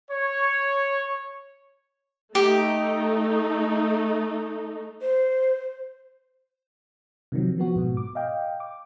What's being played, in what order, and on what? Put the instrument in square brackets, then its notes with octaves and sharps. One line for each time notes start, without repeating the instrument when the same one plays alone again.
[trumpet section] C#5
[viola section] A3 D#4 [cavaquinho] G4
[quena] C5
[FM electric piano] C3 D#3 F3 F#3
F3 B3 F#4
G#2 B2
D6
D#5 F5 G5
D6